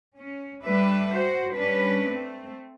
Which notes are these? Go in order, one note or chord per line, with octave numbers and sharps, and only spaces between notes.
C#4
G3 A3 D4 B4 E5
F#4 C5
G3 C#4 D4 B4
A3 C4